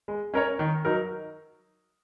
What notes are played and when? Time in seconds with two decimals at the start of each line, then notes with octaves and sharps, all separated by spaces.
0.08 G#3
0.34 C#4 A#4 C#5
0.59 D#3
0.85 F#3 D#4 A#4